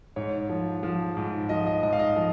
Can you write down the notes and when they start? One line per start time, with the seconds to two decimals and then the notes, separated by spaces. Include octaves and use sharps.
0.16 G#2 C#5
0.49 F3
0.83 F3
1.17 G#2
1.49 F3 D#5
1.67 D#5
1.83 G#2 D#5
1.93 F5
1.99 D#5
2.16 F3